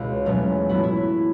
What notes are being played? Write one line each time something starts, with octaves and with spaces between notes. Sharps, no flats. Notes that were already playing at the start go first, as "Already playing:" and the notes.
Already playing: C#2 B2 G#3 E4
E2 B2 F#3 A3 C#4
A2 F#3 B3 E4 F#4
E4